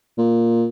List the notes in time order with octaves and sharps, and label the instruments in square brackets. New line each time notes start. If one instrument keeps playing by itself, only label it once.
[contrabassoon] A#2